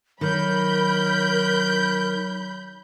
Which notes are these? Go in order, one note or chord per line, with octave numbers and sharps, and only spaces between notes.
D#3 F#3 A#4 B5 G6